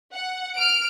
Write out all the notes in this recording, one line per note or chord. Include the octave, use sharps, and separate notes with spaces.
F#5
F6 D7